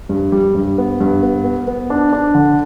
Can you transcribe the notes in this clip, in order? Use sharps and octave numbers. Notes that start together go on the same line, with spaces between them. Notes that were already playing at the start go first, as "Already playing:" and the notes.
G2
G3
G2
B3
G2
B3
B3
B3
D4
D4
D3